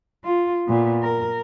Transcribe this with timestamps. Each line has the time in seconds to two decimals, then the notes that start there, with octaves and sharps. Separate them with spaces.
0.24 F4
0.67 A#2 B3
1.02 A#4